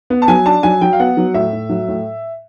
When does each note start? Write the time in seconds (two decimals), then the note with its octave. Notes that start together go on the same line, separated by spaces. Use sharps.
0.10 B3
0.22 A5
0.28 F#3 G#5
0.46 D4 A5
0.63 F#3 G#5
0.81 F#3 G5
0.93 F5
1.00 B3 F#5
1.17 F#3
1.34 A2 E5
1.53 A2
1.69 F#3
1.88 A2